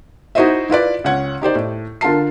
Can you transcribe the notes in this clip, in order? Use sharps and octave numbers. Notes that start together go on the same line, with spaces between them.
D#4 E4 F#4 C5 D#5 E5
E4 F4 B4 D5
C#2 C#4 F#5 G#6
D#4 G4 C5 D5
A2
D3 F4 A#4 A5 C7